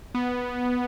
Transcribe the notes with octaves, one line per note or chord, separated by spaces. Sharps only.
B3